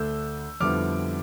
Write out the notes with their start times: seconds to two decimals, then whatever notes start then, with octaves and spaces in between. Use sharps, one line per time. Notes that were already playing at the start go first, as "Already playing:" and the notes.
Already playing: D2 D3 A3 D4 E6 G6
0.60 F2 D3 G3 B3 E4 D6 F6